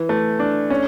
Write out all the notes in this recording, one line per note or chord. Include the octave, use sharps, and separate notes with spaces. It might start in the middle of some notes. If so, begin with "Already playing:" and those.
Already playing: E3
A3
D4
C#4